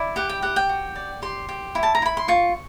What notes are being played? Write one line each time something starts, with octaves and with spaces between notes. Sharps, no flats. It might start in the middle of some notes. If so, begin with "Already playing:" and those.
Already playing: E4 D5
G4 F#5
G5
G4 F#5
G5
F#4
D5
G4 C6
G4
E4
A5
A#5
E4 B5
C6
F4 C#6